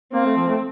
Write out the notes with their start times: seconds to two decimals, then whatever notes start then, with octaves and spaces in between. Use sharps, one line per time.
0.13 A#3 C4
0.25 A3
0.36 F3
0.47 A3